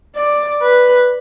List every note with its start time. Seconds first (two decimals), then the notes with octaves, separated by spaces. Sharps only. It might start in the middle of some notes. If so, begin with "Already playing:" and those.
0.15 D5
0.62 B4